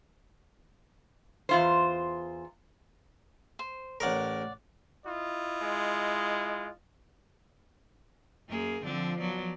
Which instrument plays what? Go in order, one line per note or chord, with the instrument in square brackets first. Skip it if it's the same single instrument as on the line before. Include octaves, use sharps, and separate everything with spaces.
[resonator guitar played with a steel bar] E2 F4 C5
[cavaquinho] C5
[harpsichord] A1 A#4 [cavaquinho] C#5 D5 F#5
[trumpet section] E4 F4 D#5
[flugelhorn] G#3
[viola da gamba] F#2 A#3 G#4
[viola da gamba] D3 C4 D4 [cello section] F3
[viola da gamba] F#3 B3 D5